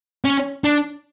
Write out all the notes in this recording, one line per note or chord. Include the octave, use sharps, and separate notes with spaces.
C#4
D4